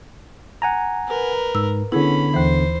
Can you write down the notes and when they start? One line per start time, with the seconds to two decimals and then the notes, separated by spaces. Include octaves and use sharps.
0.62 F#5 G#5 A#5
1.08 A#4 B4
1.55 G#2 E6
1.92 D3 B3 C#4 E4 G#4 B5
2.34 D#2 E3 C5